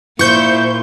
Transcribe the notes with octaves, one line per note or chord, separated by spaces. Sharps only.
A#2 E4 C5 C#6 G6